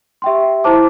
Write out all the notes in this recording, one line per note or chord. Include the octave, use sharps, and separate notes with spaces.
G4 E5 G5 C6
E4 C5 A5 D6